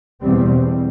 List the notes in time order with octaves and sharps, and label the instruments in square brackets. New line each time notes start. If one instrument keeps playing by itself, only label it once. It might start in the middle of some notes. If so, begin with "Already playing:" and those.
[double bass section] E2 B2 G3 C4